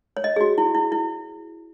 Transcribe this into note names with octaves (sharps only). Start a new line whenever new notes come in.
C#5
D#5
G#4
F#4
E4
E4
E4